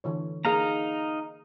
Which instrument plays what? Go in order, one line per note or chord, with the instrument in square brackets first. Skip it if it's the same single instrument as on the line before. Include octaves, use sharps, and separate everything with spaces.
[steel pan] D3 E3 C#5
[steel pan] A#3 G#4 [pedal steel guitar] D#4 F5 A#5